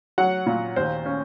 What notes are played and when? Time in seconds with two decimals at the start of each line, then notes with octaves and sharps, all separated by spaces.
0.18 F#3 F#5
0.46 A#2
0.76 D#2 C5
1.06 C#4